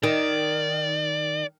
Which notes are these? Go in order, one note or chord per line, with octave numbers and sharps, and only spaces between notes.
D#3 D5